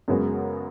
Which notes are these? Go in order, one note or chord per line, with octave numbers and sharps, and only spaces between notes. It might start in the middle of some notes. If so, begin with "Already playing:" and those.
F#2 C#3 G#3 B3 F#4